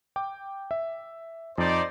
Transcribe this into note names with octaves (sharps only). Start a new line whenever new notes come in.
G5 D6
E5
F2 D#4 C5 D5